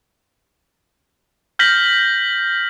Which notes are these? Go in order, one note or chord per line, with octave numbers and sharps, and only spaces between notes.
F6 G6 A#6 B6 F#7